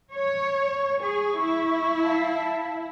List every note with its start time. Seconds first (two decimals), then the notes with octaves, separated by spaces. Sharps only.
0.12 C#5
0.66 C#6
1.01 G#4
1.39 E4
2.02 E5 F5 A5